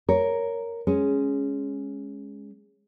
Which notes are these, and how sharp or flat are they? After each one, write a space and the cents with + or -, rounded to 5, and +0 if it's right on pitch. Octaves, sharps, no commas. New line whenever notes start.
A#4 +0 C#5 +10
G#3 +0 C#4 +0